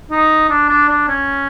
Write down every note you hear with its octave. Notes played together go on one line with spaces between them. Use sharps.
D#4
D4
D4
D4
C#4